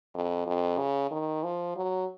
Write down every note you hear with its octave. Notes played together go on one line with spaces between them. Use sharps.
F2
F2
C#3
D#3
F3
F#3